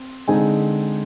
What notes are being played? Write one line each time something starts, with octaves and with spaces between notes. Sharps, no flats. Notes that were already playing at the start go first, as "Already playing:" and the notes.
Already playing: C4
D3 G#3 C4 D#4 G#5